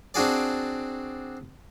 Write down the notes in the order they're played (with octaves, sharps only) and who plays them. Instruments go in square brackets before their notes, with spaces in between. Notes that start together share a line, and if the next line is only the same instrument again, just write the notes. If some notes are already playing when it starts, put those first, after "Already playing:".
[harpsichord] C4 D4 F#4 G#4 D5